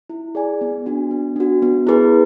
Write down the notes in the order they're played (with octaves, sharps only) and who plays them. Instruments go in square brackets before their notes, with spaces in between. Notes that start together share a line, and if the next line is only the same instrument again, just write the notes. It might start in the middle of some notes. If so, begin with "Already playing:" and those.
[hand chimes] E4
G#4 D5 G#5
B3
D4 F#4
B3
D4 F#4
B3
E4 G#4 B4